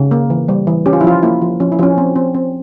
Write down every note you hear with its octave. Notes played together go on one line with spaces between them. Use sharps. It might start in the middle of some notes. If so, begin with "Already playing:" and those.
Already playing: C#3
A#3
E3
G3
E3
C#4 G4
F4
E4
F3 F4
A#3 E4
F3
F3 C#4
E4
F3 C#4
C4
C4
C4